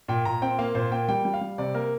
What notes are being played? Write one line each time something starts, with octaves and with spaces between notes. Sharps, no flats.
A#2 G5
A#2 A#5
C4 G5
A#3 F5
A#2 C5
A#3 G5
G3 G5
G3
F5
G3
C3 D5
A#3 A#4